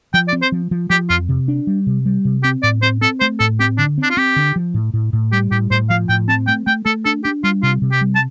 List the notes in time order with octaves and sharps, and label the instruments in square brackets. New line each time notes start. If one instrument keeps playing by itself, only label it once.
[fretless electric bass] F3 [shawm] G5
[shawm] D5
[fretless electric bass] C4
[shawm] C5
[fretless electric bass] F3
F3
[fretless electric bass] F3 [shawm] G4
[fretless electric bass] F2 [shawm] F4
[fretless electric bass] C3
D4
G3
C3
G3
C3
[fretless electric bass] C4 [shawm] G4
[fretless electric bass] A2 [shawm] D5
[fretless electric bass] C4 [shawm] C5
[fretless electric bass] C4 [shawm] A4
[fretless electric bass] A3 [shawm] C5
[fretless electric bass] A2 [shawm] A4
[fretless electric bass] C4 [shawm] G4
[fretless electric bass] D3 [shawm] D4
[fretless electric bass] C4
[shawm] D4
F4
[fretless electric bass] C4 [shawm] G4
[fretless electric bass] D3
F3
A2
A2
A2
[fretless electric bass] G3 [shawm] G4
[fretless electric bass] A2 [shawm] G4
[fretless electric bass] A2 [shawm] C5
[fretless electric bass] F3 [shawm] F5
[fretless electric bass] A2 [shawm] G5
[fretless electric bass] C4 [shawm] A5
[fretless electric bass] A3 [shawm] G5
[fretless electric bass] A3 [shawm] G5
[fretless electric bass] A3 [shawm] A4
[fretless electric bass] D4 [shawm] A4
[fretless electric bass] D4 [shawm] G4
[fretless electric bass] G3 [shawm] F4
[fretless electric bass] C3 [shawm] F4
[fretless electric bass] C3
[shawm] G4
[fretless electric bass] G3
[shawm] A5